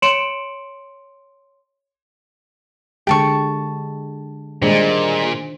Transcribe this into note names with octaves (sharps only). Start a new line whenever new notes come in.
C#5 C6 C#7 D7 E7 F#7
D3 G#3 G4 G5 A5 C#6
A#2 D#3 G3 G#3 D4 C5